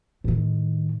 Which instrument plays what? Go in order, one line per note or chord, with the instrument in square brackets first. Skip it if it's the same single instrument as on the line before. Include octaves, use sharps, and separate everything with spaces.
[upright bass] A2 D#3